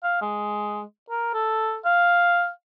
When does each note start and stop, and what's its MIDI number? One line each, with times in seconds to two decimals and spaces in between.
0.03 0.19 77
0.22 0.81 56
1.10 1.32 70
1.34 1.77 69
1.85 2.49 77